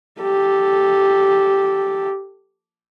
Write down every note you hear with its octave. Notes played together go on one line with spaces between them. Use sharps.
G4 A4